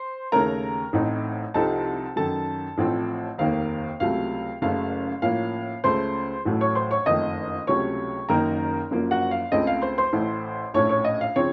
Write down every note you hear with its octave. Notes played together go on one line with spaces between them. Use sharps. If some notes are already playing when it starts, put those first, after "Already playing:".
Already playing: C5 C6
D#2 C#3 A3 C#4 A#4 A#5
A1 A2 A3 C4 D#4
C2 C3 F3 C4 D#4 A4 A5
F#2 D#3 F#3 A4 A5
A1 A2 F3 A3 C4
F1 D#2 D#3 A#3 F5
C#2 C3 F#3 A3 F5
F#1 F#2 C#3 A3 F5
A2 F3 A#3 C#4 F5
C#2 C#3 A3 C5 C6
A1 A2 F#3 A3
C#5 C#6
C5 C6
C#5 C#6
F#1 F2 D#3 A3 D#5 D#6
C#2 C3 F#3 A3 C#4 C#5 C#6
F#1 F#2 D#3 A#3 D#4 A#4 A#5
F#1 F#2 F3 A#3
F#4 F#5
F5
C#2 C#3 A3 C4 D#5
F5
C5 C6
C5 C6
A1 A2 A3
A#1 A2 A3 C#4 C#5 C#6
C#5 C#6
D#5
F5
C#3 F3 C4 C#5 C#6